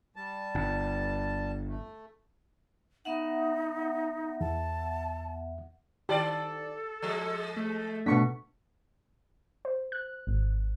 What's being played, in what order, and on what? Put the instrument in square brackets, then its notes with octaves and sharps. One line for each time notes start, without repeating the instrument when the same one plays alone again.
[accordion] G3 A5
[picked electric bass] G1
[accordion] A3
[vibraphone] B3 E5 F#5 [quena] D#4
[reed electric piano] E2 [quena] A5
[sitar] D#3 D5 [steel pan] G4 [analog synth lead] A4
[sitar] F3 G#3
[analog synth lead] A3
[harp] B2 C#6 B6 [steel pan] A3 B3 D4
[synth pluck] C5
F#6
G#1